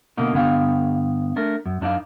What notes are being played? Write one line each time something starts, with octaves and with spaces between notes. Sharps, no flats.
B2 D3 A#3 D#4
G2 D3 B3 D4 F5 G5
A3 D4 A#4
F#2
F#2 D4 D#4 D5 F5